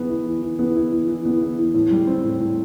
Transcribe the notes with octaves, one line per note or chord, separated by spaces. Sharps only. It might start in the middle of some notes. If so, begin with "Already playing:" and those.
Already playing: E3 B3
E4
E3
E3
B3
E4
E3
E3
B3
E4
E3
A2
G3
C4
A2
A2